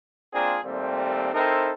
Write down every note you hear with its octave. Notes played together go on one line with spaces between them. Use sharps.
A#3 C4 D4 F4 G#4 A#4
D#2 A#2 G3 A3 C4
C4 D#4 E4 A4 A#4 C5